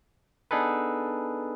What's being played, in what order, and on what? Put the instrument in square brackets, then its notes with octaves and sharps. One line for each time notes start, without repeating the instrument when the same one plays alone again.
[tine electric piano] B3 D4 D#4 G#4 A4 B4